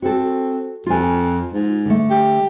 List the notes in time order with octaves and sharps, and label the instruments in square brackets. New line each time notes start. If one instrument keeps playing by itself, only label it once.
[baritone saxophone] C4 [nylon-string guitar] F#4 A4
[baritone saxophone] F2 [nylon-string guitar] F4 G#5
[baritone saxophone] G#2
[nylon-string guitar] D3 A3
[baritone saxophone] G4